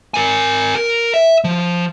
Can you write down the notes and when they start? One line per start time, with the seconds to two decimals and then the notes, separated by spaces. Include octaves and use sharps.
0.14 A#4 G#5
0.75 A#4
1.14 E5
1.44 F3